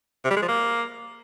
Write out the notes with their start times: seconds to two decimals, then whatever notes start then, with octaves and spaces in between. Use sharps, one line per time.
0.25 C3
0.31 G3
0.37 G#3
0.43 F3
0.48 A#3